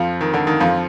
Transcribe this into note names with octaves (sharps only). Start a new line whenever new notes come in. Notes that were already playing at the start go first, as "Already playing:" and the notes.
Already playing: F2 F3
D#3
D3
D#3
F2 F3